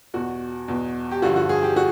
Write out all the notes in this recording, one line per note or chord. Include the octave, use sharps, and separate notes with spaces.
E2 B2 F#4
E2 B2
G4
G2 D3 F3 F#4
F#4
G#4
G4
F#4